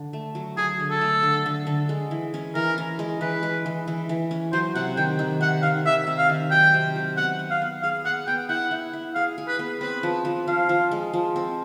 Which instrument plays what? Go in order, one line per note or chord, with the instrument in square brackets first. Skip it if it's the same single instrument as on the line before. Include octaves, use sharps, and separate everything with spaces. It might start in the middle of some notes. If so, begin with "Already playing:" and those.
Already playing: [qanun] D3
A3
F#3
[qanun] F#3 [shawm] G#4
[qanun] D3
[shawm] A4
[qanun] A3
D3
D3
D3
G#3
E3
C#4
[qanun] E3 [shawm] A#4
[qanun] C#4
G#3
[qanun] E3 [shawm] B4
[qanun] G#3
E3
E3
E3
C#4
[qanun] F#3 [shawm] C5
[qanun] C3 [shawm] F#5
[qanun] D#3 [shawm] G5
[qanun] D#3
[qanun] C3 [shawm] F#5
[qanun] D#3 [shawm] F5
[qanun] D#3 [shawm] E5
[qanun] C3
[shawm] F5
[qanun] D#3
[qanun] F#3 [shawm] G5
[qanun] C3
F#3
[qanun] B3 [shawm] F#5
[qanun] B3
[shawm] F5
[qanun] B3
[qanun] G#4 [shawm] F5
[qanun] B3 [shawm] F#5
[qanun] B3 [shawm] G5
[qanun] E4 [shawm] F#5
[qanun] E4
E4
[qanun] G#4 [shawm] F5
[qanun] G#4
[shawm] B4
[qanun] B3
[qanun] C4 [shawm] B4
[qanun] F3
F3
[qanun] F3 [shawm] F5
[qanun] F3
G#3
F3
C4